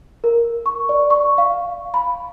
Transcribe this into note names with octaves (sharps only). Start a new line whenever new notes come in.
A#4
C#6
D5
C#6
F5
B5